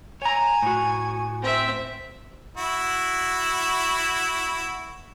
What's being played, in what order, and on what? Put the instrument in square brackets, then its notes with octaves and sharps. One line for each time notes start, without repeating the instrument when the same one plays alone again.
[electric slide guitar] C#5 A#5 [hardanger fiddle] G#5
[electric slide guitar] A2 F#4
[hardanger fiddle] C4 E5
[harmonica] E4 F#4